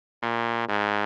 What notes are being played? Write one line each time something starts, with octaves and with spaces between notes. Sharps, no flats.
A#2
G#2